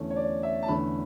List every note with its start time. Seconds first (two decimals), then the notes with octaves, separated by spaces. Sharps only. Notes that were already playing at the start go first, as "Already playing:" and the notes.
Already playing: E2 D3 A3 C#4
0.10 C#5
0.16 D5
0.43 E5
0.63 A5
0.68 E2 D3 A3 C#4 B5